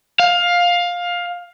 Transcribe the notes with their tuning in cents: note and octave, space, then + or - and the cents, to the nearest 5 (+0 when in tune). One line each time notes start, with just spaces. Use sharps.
F5 +15